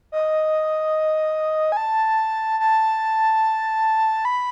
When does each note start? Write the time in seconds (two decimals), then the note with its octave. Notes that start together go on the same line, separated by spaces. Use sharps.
0.12 D#5
1.72 G#5
1.77 A5
2.60 A5
4.25 B5